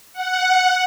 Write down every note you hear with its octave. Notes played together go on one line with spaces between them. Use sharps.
F#5